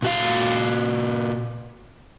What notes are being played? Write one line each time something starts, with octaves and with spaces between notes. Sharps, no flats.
A#2 F#4 F5